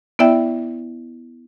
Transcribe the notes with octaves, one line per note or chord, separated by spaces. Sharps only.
B3 E4 D5 E5 G5